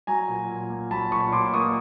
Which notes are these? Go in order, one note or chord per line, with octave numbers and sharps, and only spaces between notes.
F#3 G#5 A#5
A#2
A#2
A#3
F#3 A5 B5
A#2 B5 C#6
A#2 C6 D6
A#3 C#6 D#6